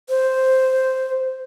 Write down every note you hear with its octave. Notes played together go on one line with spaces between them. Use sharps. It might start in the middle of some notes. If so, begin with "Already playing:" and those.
C5